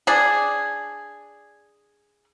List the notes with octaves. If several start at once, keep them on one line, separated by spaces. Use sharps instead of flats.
D4 G#4